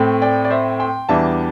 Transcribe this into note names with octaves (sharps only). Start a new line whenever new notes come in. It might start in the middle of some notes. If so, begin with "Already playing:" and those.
Already playing: A2 A3 C4
D5 G5
D5
C5 E5
G5 C6
E2 E3 G3 D4 E5 A5